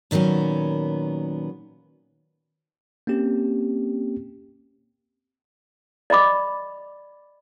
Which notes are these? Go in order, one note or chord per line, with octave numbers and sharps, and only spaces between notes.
A#2 D#3 F#3 B3 C#4
A#3 C4 C#4 G4
D5 D#5 B5 D6